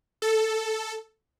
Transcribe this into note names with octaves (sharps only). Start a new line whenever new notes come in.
A4